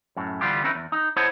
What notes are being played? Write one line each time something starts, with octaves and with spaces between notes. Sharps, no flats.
F#2 A2
D3 E3 G3 B3 F4 G4
C4 C#4 D#4 E4 B4
E2
D#4
E4 C5 C#5 D#5 F#5 A5